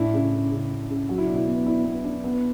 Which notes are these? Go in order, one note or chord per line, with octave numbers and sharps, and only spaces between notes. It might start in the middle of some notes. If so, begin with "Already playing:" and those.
Already playing: A2 D4 E4
C#3
C#3
C#3
D4
C#3
F#3 F#4
E4
B2 D4
E4
B3
D4 E4
B3
D4
B3